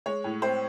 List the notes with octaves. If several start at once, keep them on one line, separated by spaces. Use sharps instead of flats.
G#3 C#5
A2
C4 C5